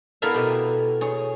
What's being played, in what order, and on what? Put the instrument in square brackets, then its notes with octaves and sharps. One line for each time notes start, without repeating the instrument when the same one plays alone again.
[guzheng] B3 E4 A4 A#4 E5 F5
B2 G4
G#4 C#5